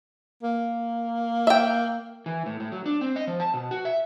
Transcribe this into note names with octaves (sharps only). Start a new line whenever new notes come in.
A#3
E5 G5
E3
A2
A2
F#3
D4
C4
D#5
F3
A5
B2
F#4
E5